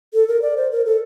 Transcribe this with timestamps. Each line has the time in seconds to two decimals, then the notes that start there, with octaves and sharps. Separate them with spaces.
0.14 A4
0.28 A#4
0.42 D5
0.57 C5
0.72 A#4
0.86 A4